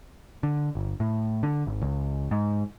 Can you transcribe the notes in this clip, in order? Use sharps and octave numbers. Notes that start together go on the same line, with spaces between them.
D3
G1
A2
D3
G#1
C#2
G#2